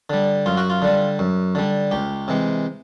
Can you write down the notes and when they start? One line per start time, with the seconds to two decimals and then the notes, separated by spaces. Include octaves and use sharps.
0.10 D3 G3
0.46 F#2 F4
0.57 F#4
0.70 F4
0.82 D3 G3
1.19 F#2
1.55 D3 G3
1.91 C#2 G4
2.28 C3 E3 G#3